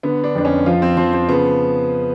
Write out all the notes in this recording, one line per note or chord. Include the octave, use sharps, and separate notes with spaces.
D3 B3
D4
F2 D4
C#4
F3 F4
C4
F3 C4
C4
C#3 B3